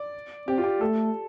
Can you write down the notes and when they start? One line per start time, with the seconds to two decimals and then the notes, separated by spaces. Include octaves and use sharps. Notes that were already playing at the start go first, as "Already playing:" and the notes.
Already playing: D5
0.48 C4 G4
0.58 F4
0.64 G4
0.81 A3 A4